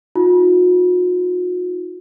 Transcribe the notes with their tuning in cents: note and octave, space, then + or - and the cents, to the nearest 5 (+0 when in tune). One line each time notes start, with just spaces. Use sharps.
D#4 +40 F#4 -45